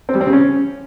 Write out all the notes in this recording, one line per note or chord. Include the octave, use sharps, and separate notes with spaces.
C4
G3
C4
C#3
C#4